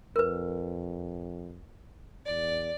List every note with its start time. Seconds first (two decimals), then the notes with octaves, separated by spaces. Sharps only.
0.16 F2 A#4 B4
2.26 E2 D5